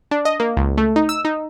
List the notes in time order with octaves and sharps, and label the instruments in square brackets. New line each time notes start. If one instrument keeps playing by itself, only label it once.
[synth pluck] D4
D#5
A#3
C#2
A3
D#4
E6
D#4